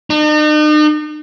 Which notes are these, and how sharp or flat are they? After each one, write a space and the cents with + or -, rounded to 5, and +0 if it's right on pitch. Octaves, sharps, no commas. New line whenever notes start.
D#4 -45